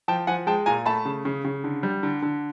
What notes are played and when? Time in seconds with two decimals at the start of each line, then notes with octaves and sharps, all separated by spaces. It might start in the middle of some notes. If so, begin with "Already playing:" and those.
0.08 F3 G5 A5
0.27 F3 F#5 G#5
0.47 G#3 G5 A5
0.66 A#2 G#5 A#5
0.86 A3 A5 B5
1.05 C#3
1.25 C#3
1.45 C#3
1.64 D3
1.83 G3
2.03 D3
2.22 D3